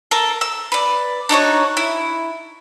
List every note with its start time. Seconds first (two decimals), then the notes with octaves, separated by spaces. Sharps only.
0.11 A4 A#4
0.41 E6
0.72 B4 D5
1.29 D4 D#4 F#4 C#5
1.77 E4